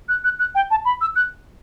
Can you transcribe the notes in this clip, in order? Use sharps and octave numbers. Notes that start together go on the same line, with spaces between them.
F#6
F#6
F#6
G5
A5
B5
E6
F#6